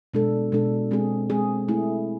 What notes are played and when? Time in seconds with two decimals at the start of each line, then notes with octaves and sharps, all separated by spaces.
0.14 B2 G#3 D4 A4
0.52 B2 G#3 D4 A4
0.91 G#3 C4 G#4
1.30 G#3 C4 G#4
1.68 A3 E4 G#4